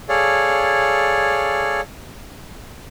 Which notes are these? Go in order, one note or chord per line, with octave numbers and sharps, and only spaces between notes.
G#4 A4 C#5 D5 F5